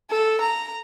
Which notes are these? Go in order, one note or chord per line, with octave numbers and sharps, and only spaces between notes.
A4
A#5